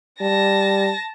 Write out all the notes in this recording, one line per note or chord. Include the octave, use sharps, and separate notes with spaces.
G3 A5 A#6